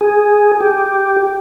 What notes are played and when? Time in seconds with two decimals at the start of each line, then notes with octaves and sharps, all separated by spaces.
0.01 G#4
0.61 G4